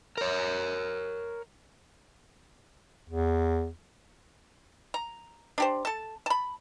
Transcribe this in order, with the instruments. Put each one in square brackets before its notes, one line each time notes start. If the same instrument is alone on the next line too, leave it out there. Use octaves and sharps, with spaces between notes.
[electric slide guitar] A#4 C#5
[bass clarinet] E2
[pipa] A#5
D4 G4 C5
A4 A5
A5 B5